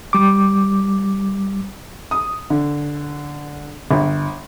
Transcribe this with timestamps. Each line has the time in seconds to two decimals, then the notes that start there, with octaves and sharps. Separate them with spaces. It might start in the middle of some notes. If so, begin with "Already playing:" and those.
0.13 G3 D6
2.11 D#6
2.50 D3
3.91 G1